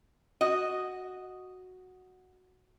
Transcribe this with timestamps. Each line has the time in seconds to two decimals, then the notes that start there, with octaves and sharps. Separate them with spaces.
0.41 F#4 D#5